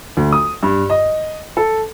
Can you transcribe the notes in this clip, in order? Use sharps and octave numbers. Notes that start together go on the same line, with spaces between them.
D2
D#6
G2
D#5
A4